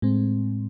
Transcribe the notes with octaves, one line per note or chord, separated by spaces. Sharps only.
A2 G#3 C4